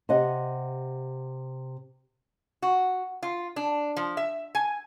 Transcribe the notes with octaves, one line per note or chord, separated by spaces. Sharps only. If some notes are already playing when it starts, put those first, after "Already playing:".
C3 D#5 F#5
F#4
F4
D4
F3
E5
G#5